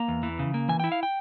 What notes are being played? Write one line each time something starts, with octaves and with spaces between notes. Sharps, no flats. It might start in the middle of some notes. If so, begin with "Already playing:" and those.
Already playing: A#3 A#5
E2
E3
C#3
A#3
E3 G#5
E4 G5
F5
G5